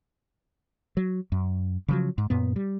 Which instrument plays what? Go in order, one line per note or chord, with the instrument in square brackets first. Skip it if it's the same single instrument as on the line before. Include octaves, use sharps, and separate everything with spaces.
[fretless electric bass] F#3
F#2
C#3 F3 F#3
G#2
F#2 A#2 B3
G3